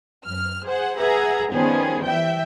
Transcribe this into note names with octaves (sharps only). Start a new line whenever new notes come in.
F#2 F6
G#4 C5 F#5
G#4 B4 E5 F#5 A#5
D#3 F3 G3 B3 C#4 G#4
E3 E5 G5